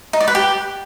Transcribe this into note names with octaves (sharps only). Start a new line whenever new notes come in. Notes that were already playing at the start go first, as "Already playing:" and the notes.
D#4
D5
B4
G4